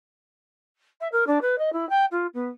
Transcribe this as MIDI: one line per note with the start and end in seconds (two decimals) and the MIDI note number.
1.01 1.08 76
1.12 1.24 70
1.27 1.39 62
1.41 1.56 71
1.58 1.72 75
1.73 1.88 64
1.89 2.05 79
2.11 2.27 65
2.34 2.49 59